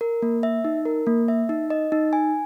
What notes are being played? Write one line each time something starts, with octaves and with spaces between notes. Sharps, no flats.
A#4
A#3
E5
D#4
A#4
A#3
E5
D#4
D#5
D#4
G#5